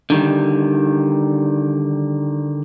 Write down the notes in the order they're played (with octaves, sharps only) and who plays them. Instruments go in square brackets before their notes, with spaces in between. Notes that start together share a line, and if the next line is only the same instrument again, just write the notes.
[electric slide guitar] D3 D#3 G3